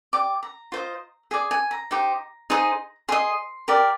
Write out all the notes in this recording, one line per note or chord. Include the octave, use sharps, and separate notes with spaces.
G4 D5 D6
A#5
F4 C5 D#5
G#4 D5 G#5
G#5
A#5
D#4 G4 C5
D#4 G#4 C5
G#4 D#5 C6
G4 A#4 D5